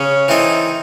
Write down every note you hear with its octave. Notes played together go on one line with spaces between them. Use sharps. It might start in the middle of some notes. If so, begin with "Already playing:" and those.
Already playing: C#3 C#4
E3 C4 D#4 A4